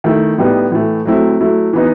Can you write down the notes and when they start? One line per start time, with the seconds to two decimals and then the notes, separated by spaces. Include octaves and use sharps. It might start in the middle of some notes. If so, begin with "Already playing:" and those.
0.04 D#3 A3 E4
0.38 A2 G3 B3 D#4
0.72 A2 E3 A3
1.05 F#3 A3 C4 E4
1.41 F#3 A3 E4
1.73 E3 B3 D#4